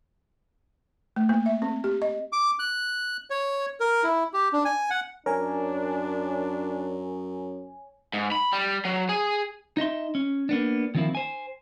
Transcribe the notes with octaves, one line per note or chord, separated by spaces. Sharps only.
A3
A#3
E5
C4
G4
D#5
D6
F#6
C#5
A#4
E4
G4
D4
G#5
F#5
F#2 D4 A#4 C#5 G#5
G#2
B5
G3
F#3
G#4
D#4 D#5 E5 C6
C#4
A#3 B3 D4
D#3 F3 A#3 C4 E4
C5 G#5